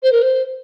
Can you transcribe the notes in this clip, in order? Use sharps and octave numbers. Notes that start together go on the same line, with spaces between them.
C5
A#4
C5